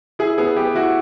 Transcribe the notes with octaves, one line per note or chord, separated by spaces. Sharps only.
E4 G#4
B3 G#4
B3 G4
E4 F#4